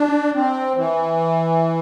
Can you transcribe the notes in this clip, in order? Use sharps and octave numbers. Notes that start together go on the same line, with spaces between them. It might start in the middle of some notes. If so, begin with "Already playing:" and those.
Already playing: D4
C4
E3